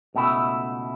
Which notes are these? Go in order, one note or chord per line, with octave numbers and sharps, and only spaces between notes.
C#2 B2 A3 E4